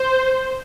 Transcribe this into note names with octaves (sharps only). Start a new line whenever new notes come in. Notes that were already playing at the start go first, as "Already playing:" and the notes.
Already playing: C5